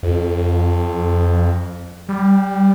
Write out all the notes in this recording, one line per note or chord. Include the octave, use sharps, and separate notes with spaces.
F2
G3